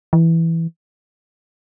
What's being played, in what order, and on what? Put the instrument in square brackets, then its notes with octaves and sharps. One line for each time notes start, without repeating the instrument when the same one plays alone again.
[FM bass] E3